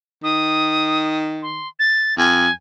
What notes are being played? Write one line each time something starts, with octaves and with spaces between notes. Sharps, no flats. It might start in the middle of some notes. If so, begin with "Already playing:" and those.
D#3 D#6
C6
A6
F2 G#5